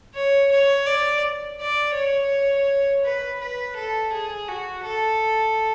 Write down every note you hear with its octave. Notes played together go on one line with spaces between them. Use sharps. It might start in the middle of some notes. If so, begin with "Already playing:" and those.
C#5
C#5
D5
D5
C#5
B4
B4
A4
G#4
F#4
A4